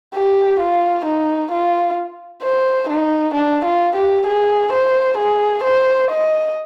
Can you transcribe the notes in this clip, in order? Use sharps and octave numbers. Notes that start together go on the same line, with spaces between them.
G4
F4
D#4
F4
C5
D#4
D4
F4
G4
G#4
C5
G#4
C5
D#5